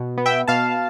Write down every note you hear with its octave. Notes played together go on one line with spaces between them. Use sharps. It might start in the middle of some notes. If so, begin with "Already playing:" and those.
Already playing: B2
B3
E5 G5
B2 F5 A5